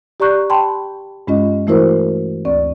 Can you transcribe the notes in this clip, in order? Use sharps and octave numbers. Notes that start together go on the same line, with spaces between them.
G4 D5 A#5 C#6 F#6 G6
G5 A5 B5 C6
G2 G#3 C#4 F4 D#5
E3 A3 E4 F#4 A#4 C5
D2 C4 D5 C#6